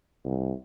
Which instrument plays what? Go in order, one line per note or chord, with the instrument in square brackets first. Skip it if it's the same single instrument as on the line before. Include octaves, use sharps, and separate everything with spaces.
[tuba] C2